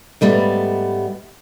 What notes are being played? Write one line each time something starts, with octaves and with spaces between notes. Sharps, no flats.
G#2 G3 A3 B3